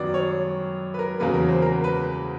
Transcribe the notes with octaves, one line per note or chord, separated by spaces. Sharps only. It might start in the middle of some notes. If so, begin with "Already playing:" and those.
Already playing: F#2 D#3 F#3 B3 D5
C#5
B4
A#4
E2 C#3 F#3 A#3 B4
A#4
C5
A#4
B4